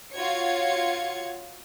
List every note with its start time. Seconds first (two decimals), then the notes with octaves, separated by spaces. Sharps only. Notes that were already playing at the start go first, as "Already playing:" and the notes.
0.14 F4 F#4 C#5 G#6 C#7